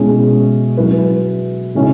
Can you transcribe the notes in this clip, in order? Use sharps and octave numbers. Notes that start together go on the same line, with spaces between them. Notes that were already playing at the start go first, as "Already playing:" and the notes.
Already playing: B2 G#3 C#4 E4 G#4
F#3 E4 B4
C#3 G#3 C#4 E4